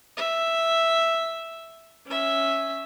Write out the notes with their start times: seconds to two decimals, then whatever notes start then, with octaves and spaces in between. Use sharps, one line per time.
0.17 E5
2.06 C#4 E5